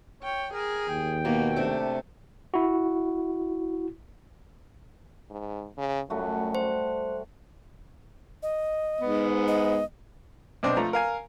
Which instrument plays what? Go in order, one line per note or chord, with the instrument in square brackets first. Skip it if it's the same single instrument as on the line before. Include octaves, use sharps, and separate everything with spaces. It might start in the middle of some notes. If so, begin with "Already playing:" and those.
[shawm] C#5 [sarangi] G5
[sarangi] G#4 [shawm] A#4
[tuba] D#2 [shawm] G5
[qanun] B2 [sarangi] A#3
[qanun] C3 D4 D6 [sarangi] A3
[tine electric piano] E4 F#4
[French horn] G#2
C#3
[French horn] F#2 [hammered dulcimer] G3 A3 F#4
[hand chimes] C5
[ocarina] D#5
[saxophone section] G#2 B3
[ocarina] D#5
[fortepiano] B1 C4 D4 D#5
F3 A3 A#5
A#4 F5 G#5